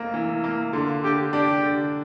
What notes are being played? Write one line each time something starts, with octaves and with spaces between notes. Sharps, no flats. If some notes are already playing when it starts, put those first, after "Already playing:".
Already playing: F1 A#3
E3
A#3
D3 F4
D3 G4
D4 G4
D3